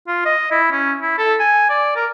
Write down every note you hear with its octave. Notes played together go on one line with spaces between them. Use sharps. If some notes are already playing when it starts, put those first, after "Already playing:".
F4
D#5
E4
C#4
E4
A4
G#5
D5
A#4